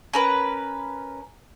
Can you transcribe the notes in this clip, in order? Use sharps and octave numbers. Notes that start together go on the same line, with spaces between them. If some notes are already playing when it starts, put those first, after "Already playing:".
C#4 A#4 B4